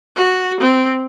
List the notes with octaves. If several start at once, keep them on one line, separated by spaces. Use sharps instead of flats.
F#4
C4